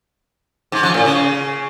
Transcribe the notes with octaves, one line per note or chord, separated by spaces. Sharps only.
G#2
F3
A2
C#3